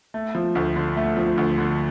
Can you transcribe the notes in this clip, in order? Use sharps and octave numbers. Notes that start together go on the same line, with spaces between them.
A3
F3
D2
D3
A3
F3
D2
D3